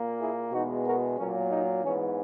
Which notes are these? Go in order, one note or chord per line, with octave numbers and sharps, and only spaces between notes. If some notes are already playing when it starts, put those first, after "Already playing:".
Already playing: A#2 A#3
E4 G#4
E2 B2 G#3 B3 D#4 F#4
F#4 A#4
A#2 F#3 A#3 C#4
D#4
G#2 E3 B3 C#4